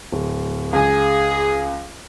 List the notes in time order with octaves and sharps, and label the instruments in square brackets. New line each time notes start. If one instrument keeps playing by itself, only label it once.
[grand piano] D1
[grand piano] C#2 G#5 [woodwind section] G#4